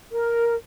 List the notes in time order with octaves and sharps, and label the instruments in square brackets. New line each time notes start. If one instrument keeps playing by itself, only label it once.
[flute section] A#4